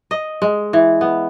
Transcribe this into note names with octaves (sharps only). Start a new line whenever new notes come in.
D#5
G#3
E3
B3